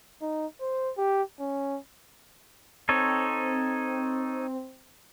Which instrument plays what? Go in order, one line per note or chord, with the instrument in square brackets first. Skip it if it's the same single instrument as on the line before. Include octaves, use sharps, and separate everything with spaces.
[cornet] D#4
C5
G4
C#4
[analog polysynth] C4 [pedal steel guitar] D#4 A4 C#5